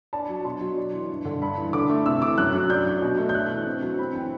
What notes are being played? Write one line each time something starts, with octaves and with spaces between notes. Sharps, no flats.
D4 A5
F#3
B2 C6
F#3
D4
E3
G2
D3
G2 B5
E3
D3 D6
A3
C3 E6
E3 D6
F#2 F#6
F#3
D4 G6
F#3
B2
A3
G6
D4 F#6
E3
C4
F#3
C4 B5
E3 G5